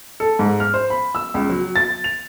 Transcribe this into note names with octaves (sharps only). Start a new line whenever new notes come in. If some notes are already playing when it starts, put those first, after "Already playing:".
A4
G#2
F6
C5
B5
E6
C#2
F#3
A6
F7